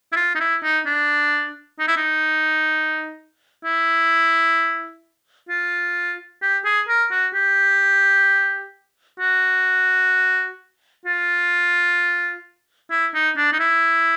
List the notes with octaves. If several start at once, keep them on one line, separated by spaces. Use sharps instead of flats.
E4
F4
D#4
E4
D#4
D4
D#4
E4
D#4
E4
F4
G4
G#4
A#4
F#4
G4
F#4
F4
E4
D#4
D4
D#4
E4